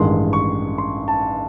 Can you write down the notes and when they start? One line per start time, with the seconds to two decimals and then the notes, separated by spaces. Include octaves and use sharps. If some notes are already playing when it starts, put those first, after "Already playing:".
Already playing: A1 G2 D#3 G#3 C6
0.33 C#6
0.78 C6
1.08 A5